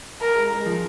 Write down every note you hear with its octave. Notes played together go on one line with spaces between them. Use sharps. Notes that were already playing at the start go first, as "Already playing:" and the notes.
A#4
G#3
G#3
F3